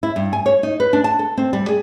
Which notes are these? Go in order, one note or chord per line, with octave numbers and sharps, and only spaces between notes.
E4
G2
G#5
C#5
D#4
B4
D4
A5
A4
C4
G3
G#4